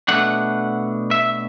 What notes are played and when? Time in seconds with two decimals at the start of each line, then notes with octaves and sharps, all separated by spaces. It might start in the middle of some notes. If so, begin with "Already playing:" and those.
0.08 B2 A3 D4 F#5
1.11 E5